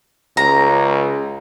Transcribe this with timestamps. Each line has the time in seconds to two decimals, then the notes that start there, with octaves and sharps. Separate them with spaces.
0.37 C#2 A#5